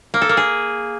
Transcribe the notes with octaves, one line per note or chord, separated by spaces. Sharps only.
A#3
A4
A#3
G#4